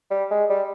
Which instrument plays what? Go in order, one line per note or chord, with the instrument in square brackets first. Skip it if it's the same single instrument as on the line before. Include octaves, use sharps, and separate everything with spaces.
[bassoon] G3
G#3
G3